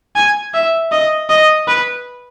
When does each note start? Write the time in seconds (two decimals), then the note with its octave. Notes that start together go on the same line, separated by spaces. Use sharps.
0.16 G#5
0.54 E5
0.92 D#5
1.30 D#5
1.68 B4